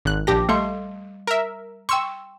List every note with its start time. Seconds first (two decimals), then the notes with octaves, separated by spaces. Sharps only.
0.05 G#1 F#6
0.27 A#1 G4 A5 D6 A#6
0.49 G3 A3 F5 C6
1.27 A#4 E5
1.89 G5 C6 C#6 E6